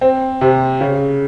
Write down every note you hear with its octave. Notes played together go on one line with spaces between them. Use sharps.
C4
C3
C#3